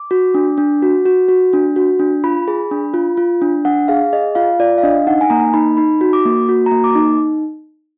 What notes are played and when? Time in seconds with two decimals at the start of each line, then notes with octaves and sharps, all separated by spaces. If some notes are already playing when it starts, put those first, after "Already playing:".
Already playing: D6
0.11 F#4
0.34 D4
0.58 D4
0.82 F#4
1.05 F#4
1.29 F#4
1.53 D4
1.76 F#4
1.99 D4
2.24 F4 B5
2.48 G#4
2.71 D4
2.94 F4
3.17 F4
3.42 D4
3.65 D4 F#5
3.88 G#4 F5
4.13 G#4 D#5
4.35 F4 F5
4.59 F4 D5
4.78 F5
4.83 D4 D#5
5.07 D#4 F#5
5.21 G#5
5.30 A#3 A#5
5.54 D#4 B5
5.77 D#4 B5
6.01 F#4
6.13 D6
6.25 A#3
6.49 F#4
6.66 A#3 A#5
6.84 D6
6.95 D#4